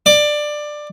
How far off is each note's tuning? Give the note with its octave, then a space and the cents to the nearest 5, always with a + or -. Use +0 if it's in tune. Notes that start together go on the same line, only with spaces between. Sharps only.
D5 +15